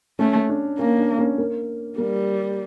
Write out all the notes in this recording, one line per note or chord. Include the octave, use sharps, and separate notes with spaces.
A3 C#4
D4
A#3 C#4
D4
C#4
A#3
G3 A#3